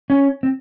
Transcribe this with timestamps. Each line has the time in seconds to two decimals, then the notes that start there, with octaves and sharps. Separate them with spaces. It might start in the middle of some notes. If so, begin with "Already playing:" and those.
0.10 C#4
0.43 C4